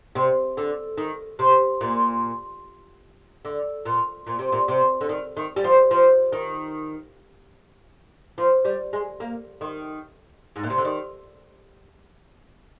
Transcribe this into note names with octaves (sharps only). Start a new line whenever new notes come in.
C3
D3
D#3
C3
A#2
D3
A#2
A#2
C3
A#2
C3
D3
D#3
D#3
G3
F3
F3
D#3
F3
G3
G#3
A#3
D#3
G#2
A#2
C3
D3
D#3